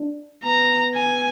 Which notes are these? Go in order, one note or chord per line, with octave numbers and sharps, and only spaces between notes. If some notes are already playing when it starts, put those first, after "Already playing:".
Already playing: D4
B3 A#5
G#5